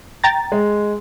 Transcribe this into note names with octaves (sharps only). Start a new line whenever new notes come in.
G5 A#5 A6
G#3